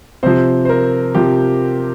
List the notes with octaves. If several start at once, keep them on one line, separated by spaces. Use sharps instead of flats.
C3 F3 C5
C5
A#4
C3 F3 G4